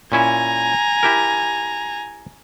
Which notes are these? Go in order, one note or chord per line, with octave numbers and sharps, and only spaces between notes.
A#2 C#4 E4 G#5 A#5
E4 G4 A#4